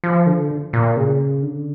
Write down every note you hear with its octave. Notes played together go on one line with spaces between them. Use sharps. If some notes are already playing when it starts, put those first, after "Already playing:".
F3
D3
A#2
C#3
D3